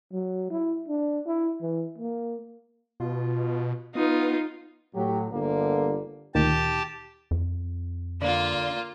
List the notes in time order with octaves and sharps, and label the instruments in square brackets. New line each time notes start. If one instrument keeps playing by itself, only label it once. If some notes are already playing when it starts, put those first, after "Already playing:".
[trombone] F#3
E4
D4
E4
E3
A#3
[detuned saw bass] B2 [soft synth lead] F4
[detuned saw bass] B3 [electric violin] D#4 F4 [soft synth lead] D#6
[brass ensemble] A2 F#3 [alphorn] G4
[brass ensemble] G1 D3 [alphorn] A#3
[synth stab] D2 A#2 D#3 [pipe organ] G4 A5
[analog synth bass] F2
[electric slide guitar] D3 D5 [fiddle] A#3 F4